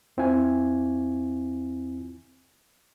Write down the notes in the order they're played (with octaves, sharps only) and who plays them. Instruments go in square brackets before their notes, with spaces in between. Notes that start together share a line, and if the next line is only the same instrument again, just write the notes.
[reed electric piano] E2 C4 E4 F4 G#5